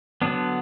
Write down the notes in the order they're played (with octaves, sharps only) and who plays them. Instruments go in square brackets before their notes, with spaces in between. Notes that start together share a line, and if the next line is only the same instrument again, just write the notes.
[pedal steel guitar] D3 F#3 B3 D4